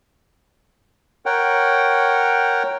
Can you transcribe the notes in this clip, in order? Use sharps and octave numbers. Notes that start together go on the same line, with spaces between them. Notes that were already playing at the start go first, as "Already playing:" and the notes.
A#4 C#5 F#5 G5